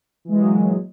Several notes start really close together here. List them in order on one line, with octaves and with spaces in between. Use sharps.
E3 G#3 A#2 F#3